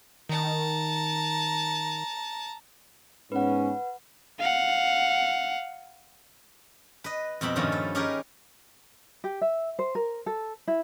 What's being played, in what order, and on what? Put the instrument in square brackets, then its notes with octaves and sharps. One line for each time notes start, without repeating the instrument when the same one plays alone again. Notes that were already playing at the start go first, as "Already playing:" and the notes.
[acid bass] D#3 [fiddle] A5 A#5
[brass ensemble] G#2 B3 C#4 [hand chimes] B4 F#5
[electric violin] F5 F#5
[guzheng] B4 D#5
F2 B2 C4 B5
G2 A#2 D#3 F3 A3 C#4
A4 B4
C#4 D#4 G4 G#4 A#4 B4
[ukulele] G4
E5
C5
A#4
A4
E4